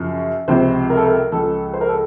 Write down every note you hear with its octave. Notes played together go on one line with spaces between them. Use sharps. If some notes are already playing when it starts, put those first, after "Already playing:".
Already playing: F#2 C#3 F3
C#2 C3 F3 C5
A#4
A4
A#4
C#2 C#3 F3 A4
C5
A#4
A4